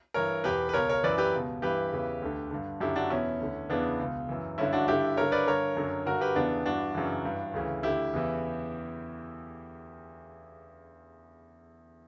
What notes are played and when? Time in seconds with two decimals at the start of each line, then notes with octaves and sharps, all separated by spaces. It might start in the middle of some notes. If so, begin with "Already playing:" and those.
0.14 G2 E3 A#4 C#5
0.44 E2 B2 G4 B4
0.69 B4
0.74 C#2 B2 A#4 C#5
0.89 A#4 C#5
1.04 F#2 E3 B4 D5
1.18 G4 B4
1.34 C#2 B2
1.62 G2 E3 G4 B4
1.92 E2 C#3 E3
2.22 D2 D3
2.51 G2 D3
2.81 F#2 D3 E4 G4
2.96 D4 F#4
3.10 E2 B2 C#4 E4
3.40 D2 D3
3.70 E2 C#3 E3 B3 D4
3.99 C#2 B2
4.29 F#2 E3
4.58 G2 D3 C#4 E4
4.73 D4 F#4
4.87 G2 D3 E4 G4
5.17 G2 D3 A#4 C#5
5.32 B4 D5
5.47 G2 D3 A#4 C#5
5.77 F#2 D3
6.06 G2 D3 F#4 A#4
6.21 G4 B4
6.36 E2 C#3 E3 B3 D4
6.65 G2 E3 D4 F#4
6.95 F#2 C#3 E3
7.25 G2 E3
7.54 D2 C#3 E3
7.83 D2 D3 E4 G4
8.13 E2 C#3 E3